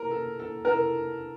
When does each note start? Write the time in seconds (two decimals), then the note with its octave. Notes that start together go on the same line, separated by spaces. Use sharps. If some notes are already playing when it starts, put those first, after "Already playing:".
Already playing: A#4
0.11 A4
0.39 A4
0.65 A#4
0.68 A4